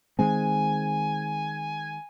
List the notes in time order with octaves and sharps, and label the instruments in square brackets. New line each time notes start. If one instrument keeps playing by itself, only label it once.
[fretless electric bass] D#3 G#3 C4 [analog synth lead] G#5